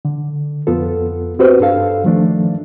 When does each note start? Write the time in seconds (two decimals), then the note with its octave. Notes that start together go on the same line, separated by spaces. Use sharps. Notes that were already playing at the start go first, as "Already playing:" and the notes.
0.05 D3
0.67 F2 B3 F4 A4
1.39 C4 F#4 G4 B4 C5
1.60 G2 D4 A4 F5
2.04 D#3 F3 A3 D4